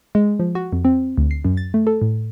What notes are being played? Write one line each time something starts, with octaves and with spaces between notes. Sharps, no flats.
G#3
F3
F#4
F2
C4
D2
C7
F#2
A6
A3
A4
A2